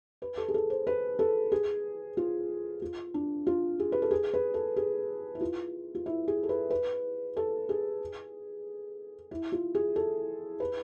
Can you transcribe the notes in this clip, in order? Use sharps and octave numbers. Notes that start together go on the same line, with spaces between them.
B4
A4
G#4
A4
C5
B4
A4
G#4
F4
F4
D4
F4
G#4
B4
A4
G#4
B4
A4
G#4
E4
F4
F4
E4
G#4
A4
B4
B4
A4
G#4
E4
F4
G#4
A4
B4